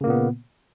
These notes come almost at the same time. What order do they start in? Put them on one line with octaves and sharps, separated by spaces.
C#3 A#3 A#2 B3